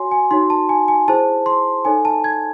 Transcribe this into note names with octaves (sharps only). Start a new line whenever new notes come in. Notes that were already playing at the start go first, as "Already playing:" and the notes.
Already playing: F#4 C#5 G#5 C6
G#5
D#4 F#4 C#5 C6
A5
G#5
G#5
E4 G#4 C5 A5
C6
D#4 A4 C#5 G#5
A5
G#6